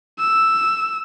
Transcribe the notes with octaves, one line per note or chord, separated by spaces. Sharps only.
E6